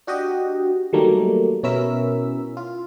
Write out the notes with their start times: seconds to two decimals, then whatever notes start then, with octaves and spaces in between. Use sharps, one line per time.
0.07 D4 F#4 G4 D#5
0.93 D#3 F#3 G3 A3 A#3
1.63 B2 C#4 E4 A#4 E6 B6
2.57 F4